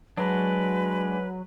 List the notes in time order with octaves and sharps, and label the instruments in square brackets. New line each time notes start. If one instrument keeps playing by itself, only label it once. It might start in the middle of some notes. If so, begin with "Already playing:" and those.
[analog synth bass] F#3 [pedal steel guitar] G#3 D4 [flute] B4